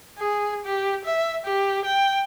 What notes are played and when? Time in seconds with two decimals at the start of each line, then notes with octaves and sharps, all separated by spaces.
0.18 G#4
0.65 G4
1.05 E5
1.45 G4
1.85 G5